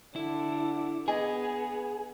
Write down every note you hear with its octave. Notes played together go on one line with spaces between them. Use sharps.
D3 E4
B3 G#4 D#5 G#5